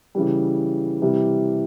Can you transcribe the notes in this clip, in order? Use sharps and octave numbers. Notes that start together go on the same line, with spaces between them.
C#3 E3 G3
C3 E3 G3